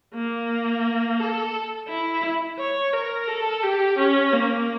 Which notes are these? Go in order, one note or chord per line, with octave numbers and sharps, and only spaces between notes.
A#3
A4
E4
C#5
A#4
A4
G4
C#4
A#3